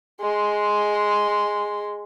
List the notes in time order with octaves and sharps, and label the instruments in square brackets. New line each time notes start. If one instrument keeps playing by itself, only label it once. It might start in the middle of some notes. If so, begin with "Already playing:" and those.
[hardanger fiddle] G#3 C6